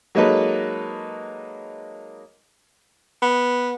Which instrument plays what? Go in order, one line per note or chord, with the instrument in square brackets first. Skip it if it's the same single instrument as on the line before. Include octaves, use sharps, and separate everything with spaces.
[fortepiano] F#3 G#3 A#3 D#4 A4 B4
[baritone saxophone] B3